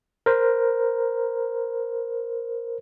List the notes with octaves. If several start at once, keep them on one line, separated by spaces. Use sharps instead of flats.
A#4 C5